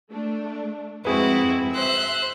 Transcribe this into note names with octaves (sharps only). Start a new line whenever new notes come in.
A3 D4
F2 G#2 C4 E4 F#4 G#4 B4
C5 E5 E6 F#6